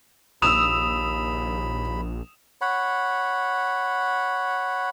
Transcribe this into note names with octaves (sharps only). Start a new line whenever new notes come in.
A#1 D#2 B5 D#6 E6 E7 F7
C#5 F#5 B5